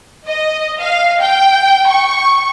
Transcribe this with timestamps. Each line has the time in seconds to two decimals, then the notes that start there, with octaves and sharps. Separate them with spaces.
0.27 D#5
0.81 F5
1.21 G5
1.88 C#6